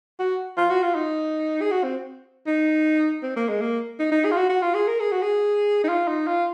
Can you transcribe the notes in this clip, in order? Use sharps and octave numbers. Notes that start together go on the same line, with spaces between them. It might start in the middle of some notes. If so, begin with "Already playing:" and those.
F#4
F4
F#4
F4
D#4
G#4
F#4
C4
D#4
C4
A#3
G#3
A#3
D#4
D#4
G#4
F4
F#4
F#4
F4
G#4
A#4
G#4
F#4
G#4
D#4
F4
D#4
F4